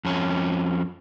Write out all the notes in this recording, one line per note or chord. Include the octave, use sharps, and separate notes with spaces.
F2 C#4